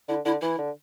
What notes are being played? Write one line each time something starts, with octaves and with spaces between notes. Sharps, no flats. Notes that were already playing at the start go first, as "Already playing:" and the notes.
D3 E4
D3 E4
E3 E4
D3